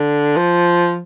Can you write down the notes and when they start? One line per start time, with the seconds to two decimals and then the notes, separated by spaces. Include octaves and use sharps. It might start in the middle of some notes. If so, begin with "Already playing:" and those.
Already playing: D3
0.37 F3